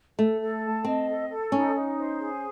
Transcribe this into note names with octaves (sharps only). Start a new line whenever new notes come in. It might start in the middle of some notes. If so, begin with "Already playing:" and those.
A3 A4
A4
A5
C4 D#5
A4
A4
C#4 D#4
D#4
C5
G#4